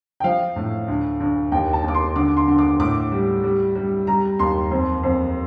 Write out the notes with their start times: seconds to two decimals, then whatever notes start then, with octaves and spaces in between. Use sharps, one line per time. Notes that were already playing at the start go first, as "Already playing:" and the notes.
0.20 G5
0.24 F3 F5
0.56 A2
0.88 D2
1.20 D2
1.52 D#2 G5
1.73 A5
1.84 D#2 D6
1.95 C6
2.16 D3 D6
2.37 C6
2.48 D3
2.58 D6
2.80 A2 D6
3.12 G3
3.44 G3
3.75 G3
4.07 G3 A#5
4.39 D#2 C6
4.72 F2
5.04 F2